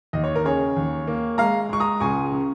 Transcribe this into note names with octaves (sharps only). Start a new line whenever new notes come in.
D#2 D#5
C#5
A#4
C#3 G#4 C#5
D#2
A#3
G#3 F5 A#5
G#3 C#6
A#5 D#6
C#2 G#5 C#6
C#3